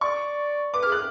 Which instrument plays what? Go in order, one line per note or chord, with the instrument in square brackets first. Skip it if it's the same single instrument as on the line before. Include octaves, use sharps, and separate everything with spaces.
[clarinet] D5 [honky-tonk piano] C#6
[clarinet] B4 [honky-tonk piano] D6
[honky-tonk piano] F6
[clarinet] G#4
[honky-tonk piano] F#6